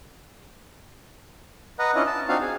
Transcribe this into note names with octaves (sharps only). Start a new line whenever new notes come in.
B4 D#5 F#5 A#5
C#4 D4 E4 F4 D#5
A5
C4 D4 D#4 F4 F#4 F5
G#4